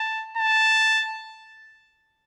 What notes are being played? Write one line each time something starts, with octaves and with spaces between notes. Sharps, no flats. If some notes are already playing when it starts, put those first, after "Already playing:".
Already playing: A5
A5